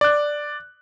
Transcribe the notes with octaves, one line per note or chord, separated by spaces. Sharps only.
D5 F#6